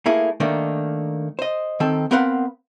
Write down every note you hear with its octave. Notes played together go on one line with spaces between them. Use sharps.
A3 A#3 E4 G#4
D#3 A3 A#3 D4
C5 D#5
D#3 C4 A4
B3 C4 A#4 B4 F5 F#5